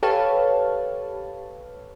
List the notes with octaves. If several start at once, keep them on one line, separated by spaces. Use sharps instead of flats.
G4 A4 B4 C#5 F5 A5